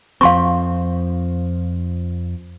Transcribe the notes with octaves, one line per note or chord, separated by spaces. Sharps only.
F2 F3 C4 F5 C6 C#6